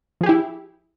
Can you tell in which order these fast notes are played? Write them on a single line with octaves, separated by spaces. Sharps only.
F3 G#4 G4 E4